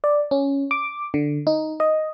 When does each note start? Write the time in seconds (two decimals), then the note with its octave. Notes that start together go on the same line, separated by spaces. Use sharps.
0.04 D5
0.31 C#4
0.71 D6
1.14 D3
1.47 D#4
1.80 D#5